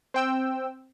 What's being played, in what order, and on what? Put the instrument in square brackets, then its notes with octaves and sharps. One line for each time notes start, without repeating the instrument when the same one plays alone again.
[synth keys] C4 G5 E6